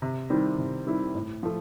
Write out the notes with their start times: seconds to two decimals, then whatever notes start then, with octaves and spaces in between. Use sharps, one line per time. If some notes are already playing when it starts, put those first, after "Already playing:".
0.02 C3
0.30 D#3 G3 C4 E4
0.58 C3
0.87 D#3 G3 C4 E4
1.15 A2
1.43 F3 A3